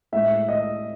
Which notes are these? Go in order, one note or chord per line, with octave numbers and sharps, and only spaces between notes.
A2 G#3 E5
D#5